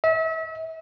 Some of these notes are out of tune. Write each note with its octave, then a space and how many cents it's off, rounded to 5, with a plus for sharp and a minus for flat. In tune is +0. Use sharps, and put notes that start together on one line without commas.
E5 -35